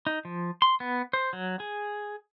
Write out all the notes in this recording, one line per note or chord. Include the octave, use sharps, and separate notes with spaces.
D#4
F3
C6
B3
C5
F#3
G#4